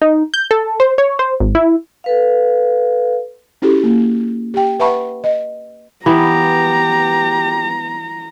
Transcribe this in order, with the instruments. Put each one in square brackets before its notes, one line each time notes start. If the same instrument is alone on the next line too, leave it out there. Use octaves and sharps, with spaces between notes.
[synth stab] D#4
G6
A4
C5
C#5
C5
G#1
E4
[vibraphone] A4 B4 F5
[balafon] C#4 E4 F#4 G4 A4
A#3
G4 G5
B4 E5 F#5 A5 B5 C#6
D#5
[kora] E3 B3 [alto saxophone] G4 [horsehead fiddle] A#5